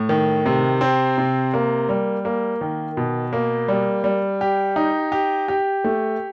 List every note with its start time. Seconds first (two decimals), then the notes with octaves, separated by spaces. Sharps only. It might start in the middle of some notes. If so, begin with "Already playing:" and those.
Already playing: A2
0.09 D#3
0.46 C3
0.81 C4
1.18 C3
1.54 A#3
1.89 G3
2.25 A#3
2.61 D#3
2.97 B2
3.33 A#3
3.68 G3
4.04 G3
4.41 G4
4.76 D#4
5.12 G4
5.48 G4
5.84 A3